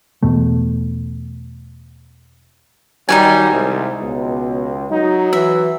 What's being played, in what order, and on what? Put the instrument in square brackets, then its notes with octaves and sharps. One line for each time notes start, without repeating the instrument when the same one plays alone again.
[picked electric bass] E2 B2 A3
[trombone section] D#3 F#3 G3 [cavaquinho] D#4 F#4 G#5
[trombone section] C2 [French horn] G#3
[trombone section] C#2 [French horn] B2
[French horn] F#3 [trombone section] D#4
[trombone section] E3 [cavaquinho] E5